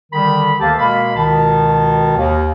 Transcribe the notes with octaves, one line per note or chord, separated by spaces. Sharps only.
D3 D#3 G3 B5
D2 D#3 A#3 G4 A4 A5
B2 G#3 A#3 A#4 B5
C#2 B2 D#3 A5
D#2